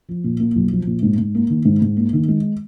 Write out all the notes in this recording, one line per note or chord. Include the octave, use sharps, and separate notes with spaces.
F3
A#2
A#3
B1
F3
A#2
G#2
G#2
A#3
D#3
G#2
G#2
A#3
D#3
G#3